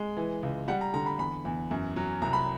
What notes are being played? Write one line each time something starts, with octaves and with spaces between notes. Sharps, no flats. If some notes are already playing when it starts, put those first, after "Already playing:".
Already playing: G#3
E3
C#2
G3 F#5
A#5
D3 A#5
B5
E2 B5
E2
F#2
F#3
C2 A#5
B5